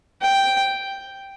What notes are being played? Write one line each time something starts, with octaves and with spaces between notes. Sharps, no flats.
G5